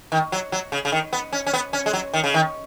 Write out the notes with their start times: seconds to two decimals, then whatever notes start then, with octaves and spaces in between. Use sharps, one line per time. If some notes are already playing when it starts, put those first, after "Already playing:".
0.12 D#3
0.32 F#3
0.52 F#3
0.72 C#3
0.85 C#3
0.92 D#3
1.13 B3
1.33 C#4
1.46 C#4
1.53 B3
1.73 C#4
1.86 G#3
1.93 F#3
2.14 D#3
2.24 C#3
2.34 D#3